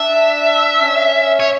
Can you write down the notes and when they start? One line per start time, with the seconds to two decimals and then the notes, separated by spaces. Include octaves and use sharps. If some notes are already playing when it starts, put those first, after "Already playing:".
Already playing: D4 E5
0.81 C#4
1.40 C#5